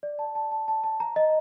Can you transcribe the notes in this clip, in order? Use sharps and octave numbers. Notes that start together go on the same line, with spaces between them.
D5
A5
A5
A5
A5
A5
A#5
D#5